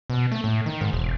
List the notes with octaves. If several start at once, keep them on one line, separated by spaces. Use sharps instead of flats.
B2
A3
A2
D#3
G#2
E1